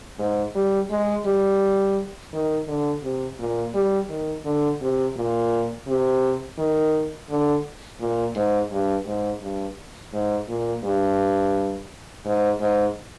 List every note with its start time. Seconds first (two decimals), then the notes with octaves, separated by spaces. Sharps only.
0.19 G#2
0.55 G3
0.90 G#3
1.26 G3
2.33 D#3
2.68 D3
3.03 C3
3.39 A#2
3.75 G3
4.09 D#3
4.45 D3
4.81 C3
5.16 A#2
5.87 C3
6.58 D#3
7.30 D3
8.00 A#2
8.35 G#2
8.71 G2
9.06 G#2
9.42 G2
10.13 G#2
10.48 A#2
10.84 G2
12.25 G#2
12.60 G#2